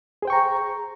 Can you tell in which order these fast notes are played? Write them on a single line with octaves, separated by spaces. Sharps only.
G#4 C5 G5 C#6 A#5